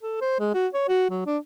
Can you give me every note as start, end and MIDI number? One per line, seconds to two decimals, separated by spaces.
0.03 0.20 69
0.21 0.40 72
0.40 0.50 56
0.54 0.67 66
0.74 0.83 73
0.88 1.10 66
1.10 1.26 54
1.26 1.38 62